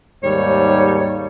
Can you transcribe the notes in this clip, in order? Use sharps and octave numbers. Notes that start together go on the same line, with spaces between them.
D#2 G#2 G3 C#5